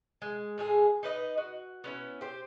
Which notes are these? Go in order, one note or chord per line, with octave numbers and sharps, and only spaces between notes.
G#3
A2 G#3 G#4
D#4 B4 D#5
F#4
B3 C#4 E4
G4 C5